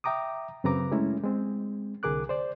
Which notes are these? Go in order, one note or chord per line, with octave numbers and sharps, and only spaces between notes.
E5 G5 A#5 D6 D#6
F#2 C#3 C4 B4 A#5 D6
G#3 A3 C#4 E4
G#3 C4
C2 D3 G#4 A#4 D6 F#6
C5 D5